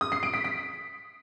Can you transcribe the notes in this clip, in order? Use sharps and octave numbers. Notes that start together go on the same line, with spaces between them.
D#6
C7
D7
B6
B6